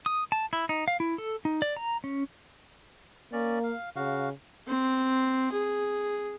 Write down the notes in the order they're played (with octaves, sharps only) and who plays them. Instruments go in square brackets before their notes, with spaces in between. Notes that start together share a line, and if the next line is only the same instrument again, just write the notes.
[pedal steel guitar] D#6
A5
E4
D#4
F5
E4
A4
D#4
D5
A#5
C#4
[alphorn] A#3 [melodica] C#4 D5
[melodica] F5
[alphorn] C#3 [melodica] F#4 F5
[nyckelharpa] C4
G#4